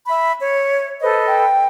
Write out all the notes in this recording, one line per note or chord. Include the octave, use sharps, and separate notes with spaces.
E5 B5
C#5
A4 B4 C5 D#5
G5